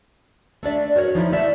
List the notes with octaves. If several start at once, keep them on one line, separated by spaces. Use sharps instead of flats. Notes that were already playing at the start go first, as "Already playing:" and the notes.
A3 D4 D5 E5
F#4 A#4 C#5
F3 D#4 E4
A3 D5 E5